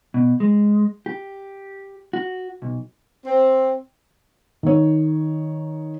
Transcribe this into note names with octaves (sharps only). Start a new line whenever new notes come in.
B2
G#3
G4
F#4
B1
C4
D#3 C#5